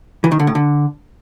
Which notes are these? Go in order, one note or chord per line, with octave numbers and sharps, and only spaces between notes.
E3
D#3
D3
A2
D3